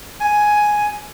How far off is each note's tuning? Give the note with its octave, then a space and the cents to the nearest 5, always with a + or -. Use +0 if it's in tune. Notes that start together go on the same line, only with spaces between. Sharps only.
G#5 +5